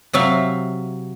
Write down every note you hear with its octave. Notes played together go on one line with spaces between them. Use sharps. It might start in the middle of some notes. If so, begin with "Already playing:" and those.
C3 F#3 E5 F5